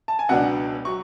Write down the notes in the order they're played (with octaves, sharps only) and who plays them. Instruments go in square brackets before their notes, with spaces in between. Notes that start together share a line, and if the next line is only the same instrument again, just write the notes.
[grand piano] A5
G#5
C#2 B2 F#3 B3 D4 F#5
F#3 C#6